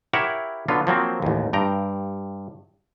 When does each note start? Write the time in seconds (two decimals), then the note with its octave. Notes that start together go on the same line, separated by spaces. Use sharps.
0.13 E4 G4 A#4 C#5 E5 F#5
0.68 D3 F#3 B3 F4
0.87 F3 F#3 A#3 C4
1.22 A1 D#2
1.53 G2 G5 A#5